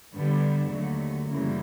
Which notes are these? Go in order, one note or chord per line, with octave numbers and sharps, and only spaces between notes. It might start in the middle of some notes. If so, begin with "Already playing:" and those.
G2 D3 G3 B3 D4
D#2 D3 F#3 A3
F#2 C#3 E3 G3 A#3